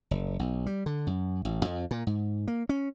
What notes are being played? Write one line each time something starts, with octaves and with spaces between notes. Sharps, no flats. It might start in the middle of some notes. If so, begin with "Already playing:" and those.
F#1
B1
G3
D3
F#2
A1
F2
A#2
G#2
A#3
C#4